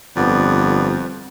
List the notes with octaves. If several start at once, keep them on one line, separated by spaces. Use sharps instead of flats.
G1 F2 B3 D5